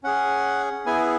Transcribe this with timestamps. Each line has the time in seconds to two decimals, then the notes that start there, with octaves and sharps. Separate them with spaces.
0.03 C#4 G#4 F#5
0.86 B3 E4 G#4 G#5